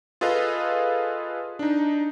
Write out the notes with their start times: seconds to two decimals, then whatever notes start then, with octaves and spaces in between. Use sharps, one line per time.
0.21 F4 G#4 A4 B4 D#5 F5
1.59 D4 D#4